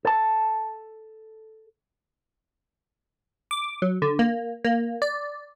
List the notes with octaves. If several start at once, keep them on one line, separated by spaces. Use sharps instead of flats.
A4 A5
D6
F#3
D3
A#3
A#3
D5